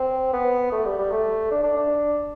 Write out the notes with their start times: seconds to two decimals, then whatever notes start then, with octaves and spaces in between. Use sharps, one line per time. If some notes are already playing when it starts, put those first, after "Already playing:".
Already playing: C4
0.33 B3
0.72 A3
0.85 G3
0.99 G3
1.12 A3
1.51 D4
1.63 D4
1.76 D4